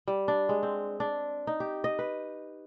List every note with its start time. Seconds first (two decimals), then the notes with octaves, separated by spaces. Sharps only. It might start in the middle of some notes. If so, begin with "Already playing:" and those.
0.08 G3
0.28 D4
0.49 G#3
0.63 C4
1.00 D4
1.47 D#4
1.60 G4
1.84 D#5
1.99 B4